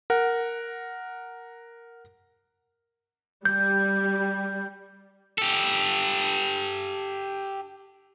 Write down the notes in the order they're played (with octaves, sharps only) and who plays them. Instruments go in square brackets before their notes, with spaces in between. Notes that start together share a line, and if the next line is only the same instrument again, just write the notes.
[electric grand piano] A#4 F#5
[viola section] G3 [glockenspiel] G6
[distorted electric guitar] G4 A4